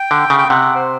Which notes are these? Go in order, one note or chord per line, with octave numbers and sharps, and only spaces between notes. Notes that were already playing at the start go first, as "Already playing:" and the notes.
Already playing: G5
D3
C#3
G5
C3 F#5
C5